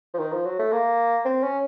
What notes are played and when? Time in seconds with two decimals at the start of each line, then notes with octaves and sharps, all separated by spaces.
0.14 F3
0.19 D#3
0.32 F3
0.46 F#3
0.59 A3
0.72 A#3
1.25 C4
1.43 C#4